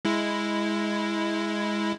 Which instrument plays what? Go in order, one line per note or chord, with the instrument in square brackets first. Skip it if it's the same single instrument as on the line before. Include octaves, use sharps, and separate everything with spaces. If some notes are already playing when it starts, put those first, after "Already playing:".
[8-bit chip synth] G#3 E4